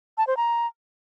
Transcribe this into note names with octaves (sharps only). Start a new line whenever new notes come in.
A5
C5
A#5